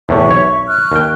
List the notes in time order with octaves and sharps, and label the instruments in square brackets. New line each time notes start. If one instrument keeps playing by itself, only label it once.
[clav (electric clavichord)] E2 A2 C3 [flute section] E5 C#6
[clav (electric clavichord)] B1 C#5
[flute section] C#6 F6 F#6
[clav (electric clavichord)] D#2 G5